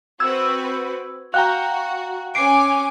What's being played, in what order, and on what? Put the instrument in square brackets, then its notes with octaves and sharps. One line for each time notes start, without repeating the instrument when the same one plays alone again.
[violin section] C4 F#4 B4 [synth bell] E6 [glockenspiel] G#6
[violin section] F#4 [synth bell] F5 G5 A#5 [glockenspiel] F#6
[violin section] C#4 G#5 D6 [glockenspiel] C7 D7